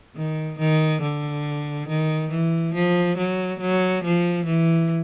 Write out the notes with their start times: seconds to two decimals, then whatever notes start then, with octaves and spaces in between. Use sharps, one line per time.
0.16 D#3
0.59 D#3
1.02 D3
1.88 D#3
2.30 E3
2.74 F3
3.18 F#3
3.60 F#3
4.04 F3
4.45 E3